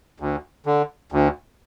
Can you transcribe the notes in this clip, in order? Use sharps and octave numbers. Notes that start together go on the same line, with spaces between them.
D2
D3
D2